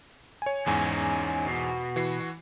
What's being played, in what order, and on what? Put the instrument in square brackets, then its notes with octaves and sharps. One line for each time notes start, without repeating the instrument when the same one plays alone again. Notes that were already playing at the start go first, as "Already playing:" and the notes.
[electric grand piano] C#5 G#5
[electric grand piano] E2 G#2 G#5 [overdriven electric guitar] C#4 D#4
[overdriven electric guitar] B2
[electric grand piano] E3 F#4 C7